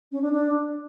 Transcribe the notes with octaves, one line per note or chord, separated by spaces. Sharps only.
C#4
D4
D4